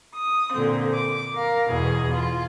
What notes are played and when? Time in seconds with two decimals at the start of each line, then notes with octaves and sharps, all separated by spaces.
0.15 D#6
0.53 A#2 D3 C4
0.94 D6
1.34 A#4 F5
1.70 E2 B2 G#4
2.13 F4